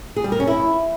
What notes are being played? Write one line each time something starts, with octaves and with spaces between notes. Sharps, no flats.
G#4
G3
A#4
C#4
E4